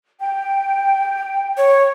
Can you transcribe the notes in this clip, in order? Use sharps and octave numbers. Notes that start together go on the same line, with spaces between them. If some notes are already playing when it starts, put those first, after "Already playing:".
G5
C#5